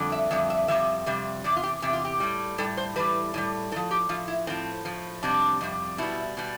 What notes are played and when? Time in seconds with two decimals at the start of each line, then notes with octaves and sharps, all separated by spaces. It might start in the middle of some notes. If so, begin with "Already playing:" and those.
Already playing: F2 D3 G3
0.12 E5
0.31 F2 D3 G3 E5
0.50 E5
0.68 F2 C3 E3 G3 E5
1.06 F2 C3 G3
1.44 E2 C3 D5
1.57 F4
1.63 G4
1.82 E2 C3 G4
1.93 F4
2.05 G4
2.20 A2 G3
2.58 A2 G3 A4
2.77 C5
2.96 A2 E3 G3 B4
3.34 A2 E3 G3
3.71 A2 A4
3.76 F3
3.91 G4
4.09 A2 F3 F4
4.28 E4
4.47 A2 F3 C4
4.85 A2 F3
5.23 F2 C3 G3 D4
5.61 F2 C3 G3
5.98 B2 G3 E4
6.37 B2 G3